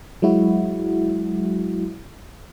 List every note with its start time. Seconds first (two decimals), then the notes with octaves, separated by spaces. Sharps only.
0.22 F#3 G#3 E4 F#4